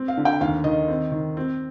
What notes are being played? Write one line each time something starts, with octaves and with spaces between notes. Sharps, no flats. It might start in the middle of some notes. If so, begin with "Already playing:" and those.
Already playing: C4
F5
D3
G5
D#2 F5
D#3 D#5
C4
D#3
C4